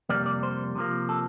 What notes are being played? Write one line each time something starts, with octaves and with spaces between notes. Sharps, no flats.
F2 C3 G3 A#3 D5
D5
C5
C3 F3 A#3
A4